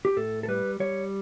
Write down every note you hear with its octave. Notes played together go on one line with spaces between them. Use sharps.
G4
A2 A4
A4
G3 B4
G3 C#5